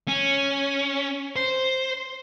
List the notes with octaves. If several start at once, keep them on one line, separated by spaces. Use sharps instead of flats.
C#4
C5